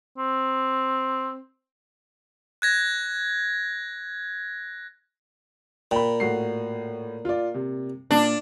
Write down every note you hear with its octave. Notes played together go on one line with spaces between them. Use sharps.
C4
F#6 G#6 A#6
A#2 G5 B5
A2 F#4 C7
F4 D5
C3
A#2 D4